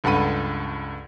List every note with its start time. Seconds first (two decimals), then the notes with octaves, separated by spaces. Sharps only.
0.04 C#2 G2 A4 F#5 B5 D#7